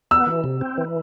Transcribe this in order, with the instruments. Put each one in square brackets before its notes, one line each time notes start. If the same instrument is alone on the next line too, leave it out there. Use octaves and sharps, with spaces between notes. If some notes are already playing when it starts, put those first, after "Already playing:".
[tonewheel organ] B3 [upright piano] E6
[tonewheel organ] E3
C3
C4
E3